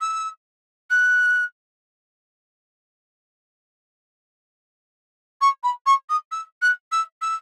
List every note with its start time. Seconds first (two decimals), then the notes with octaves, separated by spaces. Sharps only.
0.01 E6
0.90 F#6
5.41 C#6
5.63 B5
5.86 C#6
6.09 D#6
6.31 E6
6.61 F#6
6.92 E6
7.21 E6